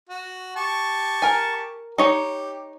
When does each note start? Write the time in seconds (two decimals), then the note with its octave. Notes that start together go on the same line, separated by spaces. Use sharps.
0.10 F#4
0.56 G4 A5 C#6
1.22 A#4 G#5
1.98 D#4 G4 C#5